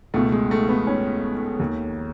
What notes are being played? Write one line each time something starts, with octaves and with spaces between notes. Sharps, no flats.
C#2 B2 A3
G#3
A3
B3
C#4
D#2 D#3